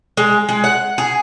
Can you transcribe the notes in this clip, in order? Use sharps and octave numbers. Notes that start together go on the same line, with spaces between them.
G#3
G#3
F#5
G#4